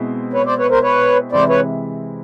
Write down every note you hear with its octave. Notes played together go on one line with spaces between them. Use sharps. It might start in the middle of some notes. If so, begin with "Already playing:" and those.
Already playing: B2 G#3 C4 E4
B4 C#5
C5 D5
B4 C#5
A#4 C5
B4 C#5
C3 E3 G#3 C4 E4 C5 D5
B4 C#5